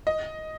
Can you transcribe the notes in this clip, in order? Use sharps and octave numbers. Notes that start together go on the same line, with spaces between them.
D#5